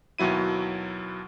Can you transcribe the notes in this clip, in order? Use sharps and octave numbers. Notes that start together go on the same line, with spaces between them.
D#2 B2 F#3 E4 D#7